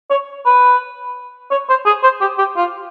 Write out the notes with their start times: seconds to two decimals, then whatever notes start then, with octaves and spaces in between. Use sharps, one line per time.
0.10 C#5
0.46 B4
1.51 C#5
1.69 C5
1.86 G#4
2.03 C5
2.21 G4
2.38 G4
2.56 F4